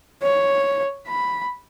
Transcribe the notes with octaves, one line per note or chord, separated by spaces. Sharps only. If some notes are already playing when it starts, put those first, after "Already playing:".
C#5
B5